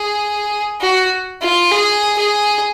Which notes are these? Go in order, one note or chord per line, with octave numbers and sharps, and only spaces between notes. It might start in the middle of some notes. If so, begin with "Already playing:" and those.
Already playing: G#4
F#4
F4
G#4
G#4